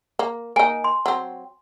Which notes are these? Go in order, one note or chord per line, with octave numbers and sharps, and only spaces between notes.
A#3
A#3 D#4 G#5
C6
F#3 C4